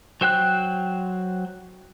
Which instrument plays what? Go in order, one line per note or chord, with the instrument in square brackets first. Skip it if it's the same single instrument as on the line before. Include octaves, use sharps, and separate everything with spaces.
[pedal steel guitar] F#3 C5 G5 F#6